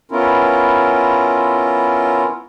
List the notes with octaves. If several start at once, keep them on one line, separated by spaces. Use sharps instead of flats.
B3 C#4 E4 F4 A#4